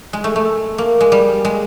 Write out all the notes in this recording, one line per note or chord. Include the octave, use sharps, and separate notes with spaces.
G#3
A3
A3
A#3
G#3
G3
G#3